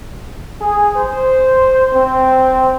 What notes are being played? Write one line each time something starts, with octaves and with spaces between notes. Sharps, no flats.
G#4
C5
C4